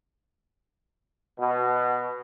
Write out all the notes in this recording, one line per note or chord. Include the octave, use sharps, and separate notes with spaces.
B2